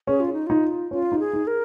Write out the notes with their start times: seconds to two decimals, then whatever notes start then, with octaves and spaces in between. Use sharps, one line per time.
0.07 C#4 G#4
0.20 F4
0.33 D#4
0.47 D#4 F4
0.91 C#4 F4
1.12 D#4
1.19 G#4
1.33 D#4
1.47 A#4